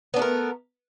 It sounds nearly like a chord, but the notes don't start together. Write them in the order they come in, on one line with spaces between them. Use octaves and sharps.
B3 D4 A3 A#4